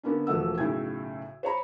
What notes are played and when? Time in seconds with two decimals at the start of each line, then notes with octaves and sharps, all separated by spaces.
0.03 D3 A#3 B3 C#4 D4
0.27 E1 F3 A3 F#5 E6
0.58 B1 A2 C#3 C#4 G5 G#6
1.43 C5 C#5 A#5 B5